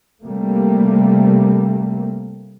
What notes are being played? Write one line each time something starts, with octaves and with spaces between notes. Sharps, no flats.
C3 G3 A3 A#3